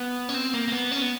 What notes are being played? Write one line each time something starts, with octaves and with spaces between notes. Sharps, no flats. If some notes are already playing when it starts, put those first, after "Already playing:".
Already playing: B3
C#4
C4
A#3
A#3
B3
C#4
B3